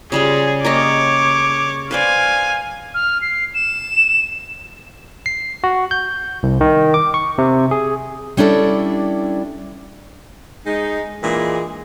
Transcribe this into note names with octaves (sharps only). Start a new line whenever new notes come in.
C#3 G3 F4 G#4
A#3 G4 C#5 D#5 D6
B4 C5 D5 F5 G#5
F6
C7
E7
C7
F#4
G6
C2
D#3
D6
C#6
C3
G#4
G3 C#4 D4 E4 A4
G#3 D#4
A#2 E3 G#3 D4 G#4